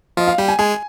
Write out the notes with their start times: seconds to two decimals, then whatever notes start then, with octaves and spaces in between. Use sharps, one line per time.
0.17 F3 F4 D#5
0.27 F5
0.38 G3 G4 G5
0.48 G#5
0.59 G#3 G#4 G#5